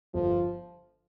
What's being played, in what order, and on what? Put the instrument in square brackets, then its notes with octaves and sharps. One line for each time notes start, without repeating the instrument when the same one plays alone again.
[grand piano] G1 [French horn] F3